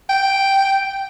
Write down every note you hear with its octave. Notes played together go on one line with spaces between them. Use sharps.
G5